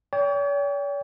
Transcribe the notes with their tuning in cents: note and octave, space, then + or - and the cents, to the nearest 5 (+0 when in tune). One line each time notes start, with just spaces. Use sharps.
C#5 +45 G5 +20